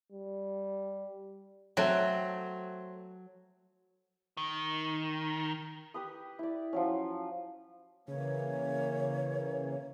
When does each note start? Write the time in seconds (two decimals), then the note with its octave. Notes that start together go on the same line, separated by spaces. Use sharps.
0.13 G3
1.77 F#3 A3 C4
4.37 D#3
5.94 G4 B4 D#6
6.39 E4 D5
6.73 F3 F#3 C#4
8.08 C#3 E3 A#3 C#5